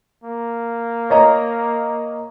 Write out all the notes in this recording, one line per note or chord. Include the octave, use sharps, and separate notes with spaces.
A#3
C#5 D#5 A#5